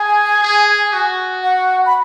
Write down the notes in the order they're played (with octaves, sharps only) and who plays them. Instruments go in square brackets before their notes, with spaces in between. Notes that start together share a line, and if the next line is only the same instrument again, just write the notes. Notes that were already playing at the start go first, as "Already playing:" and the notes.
Already playing: [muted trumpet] G#4 [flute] G#5
[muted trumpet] G#4
F#4
[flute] F#5
B5